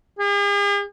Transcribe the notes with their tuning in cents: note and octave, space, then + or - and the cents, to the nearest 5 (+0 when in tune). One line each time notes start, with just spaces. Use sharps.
G#4 -45